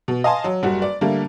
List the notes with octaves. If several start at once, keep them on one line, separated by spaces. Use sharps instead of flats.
B2
D#5 F5 G#5 A5 C6
F#3
F#1 G3 F#4
D5
D3 G3 A3 A#3